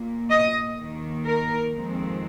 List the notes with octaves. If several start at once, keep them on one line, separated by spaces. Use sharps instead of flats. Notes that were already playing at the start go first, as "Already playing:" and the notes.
Already playing: A#2 A#3
D#5
D#2 D#3 A#3
A#4
F2 D#3 G#3 C4